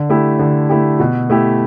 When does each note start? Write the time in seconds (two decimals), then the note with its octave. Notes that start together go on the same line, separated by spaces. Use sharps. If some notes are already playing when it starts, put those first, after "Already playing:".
Already playing: D3
0.09 A3 E4 G4
0.39 D3
0.69 A3 E4 G4
1.00 B2
1.30 A3 E4 G4